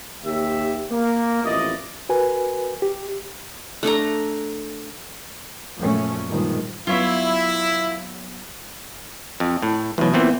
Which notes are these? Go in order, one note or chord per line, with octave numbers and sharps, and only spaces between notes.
D#2 G4 E5
A#3
A1 F2 A#2 E4 D5 D#5
F#4 A#4 B4 G#5
G4
A3 D4 A4 A#5
F#2 A#2 F3 A3 C#4
G2 A#2 D#3 F3 G#3
F#3 B3 E4 F4 C#5 E5
F2
A2
D2 B2 E3 F#3
A#2 E3 B3 C4